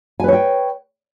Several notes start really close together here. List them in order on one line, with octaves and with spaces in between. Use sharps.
G#5 B4 C#5 G5